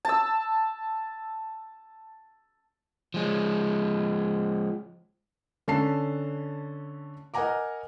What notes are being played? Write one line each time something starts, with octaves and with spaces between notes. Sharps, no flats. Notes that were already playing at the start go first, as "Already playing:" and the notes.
A5 E6
F3 G#3
D3 C#4 A4 A5 C7
A#4 D#5 F#5 G#5 A#5 D6